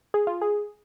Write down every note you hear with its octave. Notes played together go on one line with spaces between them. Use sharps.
G#4
F4
G#4